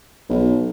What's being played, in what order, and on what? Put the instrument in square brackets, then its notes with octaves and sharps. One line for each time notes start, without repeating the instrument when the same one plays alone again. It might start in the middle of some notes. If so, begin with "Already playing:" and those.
[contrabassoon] B1